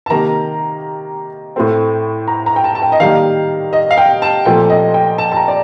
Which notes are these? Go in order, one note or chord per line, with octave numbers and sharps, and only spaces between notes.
A5
C3 D#3 A#3 A#5
A2 A3 C4
A#5
A#5
G5
A5
A5
G5
D#5
D#3 G3 A#3 F5
D#5
F5
G5
A5
A#2 F3 A3 C4 G5
D#5
G5
A5
A5
A#5
D5